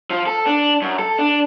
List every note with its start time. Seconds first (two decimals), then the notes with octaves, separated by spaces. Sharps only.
0.10 F3
0.27 A4
0.47 D4
0.82 F#2
0.99 A4
1.19 D4